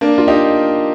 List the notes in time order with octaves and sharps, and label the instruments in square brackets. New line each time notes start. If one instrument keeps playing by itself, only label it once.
[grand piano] A#3 D4
F4
D#4 G4